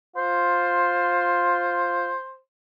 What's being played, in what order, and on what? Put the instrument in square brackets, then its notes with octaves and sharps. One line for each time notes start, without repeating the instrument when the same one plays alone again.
[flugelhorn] F4 [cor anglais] C5